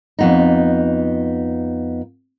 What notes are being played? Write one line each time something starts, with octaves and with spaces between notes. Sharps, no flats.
F2 B3 D#4